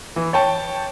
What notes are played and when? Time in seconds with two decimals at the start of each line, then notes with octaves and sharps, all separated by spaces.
0.16 E3
0.33 C#5 G5 A5